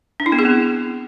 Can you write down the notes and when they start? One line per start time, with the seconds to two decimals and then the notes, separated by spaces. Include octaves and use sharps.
0.20 D4
0.26 E4
0.32 B3
0.39 G#4
0.45 C4